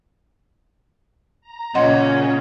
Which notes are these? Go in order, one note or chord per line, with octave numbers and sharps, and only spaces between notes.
A#5
A#2 C#3 C#4 D#5 F#5 C6